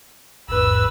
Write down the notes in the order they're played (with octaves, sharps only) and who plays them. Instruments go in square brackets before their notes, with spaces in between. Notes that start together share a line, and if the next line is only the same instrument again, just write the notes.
[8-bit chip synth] A1 E2 G#2 [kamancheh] B4 E6